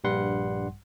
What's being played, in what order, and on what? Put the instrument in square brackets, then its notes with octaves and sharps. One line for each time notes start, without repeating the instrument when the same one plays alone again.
[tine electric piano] A#1 G2 G3 F#5 C6